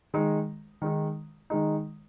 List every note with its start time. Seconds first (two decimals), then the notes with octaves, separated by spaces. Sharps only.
0.14 D#3 G#3 D#4
0.82 D#3 G#3 D#4
1.50 D#3 G#3 D#4